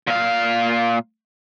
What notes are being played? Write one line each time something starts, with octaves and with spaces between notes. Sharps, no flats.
A#2 F5